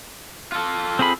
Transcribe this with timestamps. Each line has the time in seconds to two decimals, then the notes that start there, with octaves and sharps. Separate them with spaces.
0.52 F4 A4
0.99 C4 G#4 B5